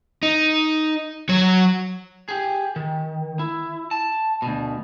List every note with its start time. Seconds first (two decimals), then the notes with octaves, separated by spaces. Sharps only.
0.23 D#4
1.29 F#3 C#5
2.29 G4 G#4
2.76 D#3
3.39 E4
3.91 A5
4.42 D2 B2